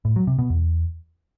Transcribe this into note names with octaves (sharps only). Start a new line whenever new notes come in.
A2
F#3
C3
B2
E2